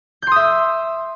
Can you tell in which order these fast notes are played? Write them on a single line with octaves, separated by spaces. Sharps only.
G6 C6 D#6 E5